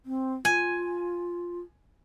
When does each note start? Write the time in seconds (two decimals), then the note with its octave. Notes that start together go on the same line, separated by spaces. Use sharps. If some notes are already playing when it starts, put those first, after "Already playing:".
0.06 C4
0.45 F4 G#5